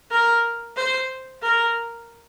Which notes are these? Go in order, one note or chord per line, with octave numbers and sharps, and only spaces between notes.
A#4
C5
A#4